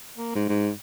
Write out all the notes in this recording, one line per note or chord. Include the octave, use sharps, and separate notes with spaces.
A#3
G#2
G#2